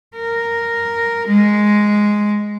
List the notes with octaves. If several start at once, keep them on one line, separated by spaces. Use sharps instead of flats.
A#4
G#3